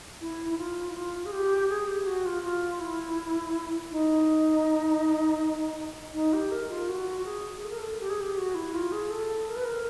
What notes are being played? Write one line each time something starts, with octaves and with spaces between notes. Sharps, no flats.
E4
E4
F4
E4
F4
G#4
G4
G#4
G4
F#4
F4
F4
E4
D#4
D#4
G4
A#4
F4
F#4
G#4
A4
A#4
A4
G4
G#4
G4
F#4
E4
F4
G#4
A4
A#4
B4
A#4